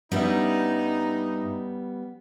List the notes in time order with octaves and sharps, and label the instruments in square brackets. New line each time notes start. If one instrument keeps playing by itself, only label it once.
[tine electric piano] G2 E5 [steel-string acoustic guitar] G3 B3 C#4 [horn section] D#4